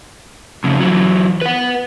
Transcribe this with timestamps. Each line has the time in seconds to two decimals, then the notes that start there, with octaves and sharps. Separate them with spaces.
0.64 F2 C#3
0.80 E3 F#3
1.41 B4 F#5